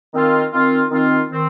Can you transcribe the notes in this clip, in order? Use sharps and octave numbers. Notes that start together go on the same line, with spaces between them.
D#3 C4 F4
D#3 C4 F4
D#3 C4 F4
D#3 C4